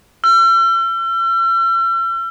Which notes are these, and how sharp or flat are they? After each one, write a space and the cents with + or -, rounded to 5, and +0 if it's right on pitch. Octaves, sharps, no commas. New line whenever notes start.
E6 +45